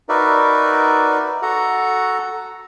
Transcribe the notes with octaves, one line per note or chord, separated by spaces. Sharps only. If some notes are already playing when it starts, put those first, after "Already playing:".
D#4 F#4 A#4 B4 D5 E5
F#4 A4 F#5 A#5